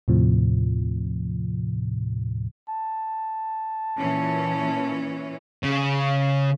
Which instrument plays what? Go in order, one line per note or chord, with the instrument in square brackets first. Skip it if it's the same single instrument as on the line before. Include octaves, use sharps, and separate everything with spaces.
[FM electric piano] D#2 A2 C3 F3
[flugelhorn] A5
[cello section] A#2 E3 C#4
[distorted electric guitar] C#3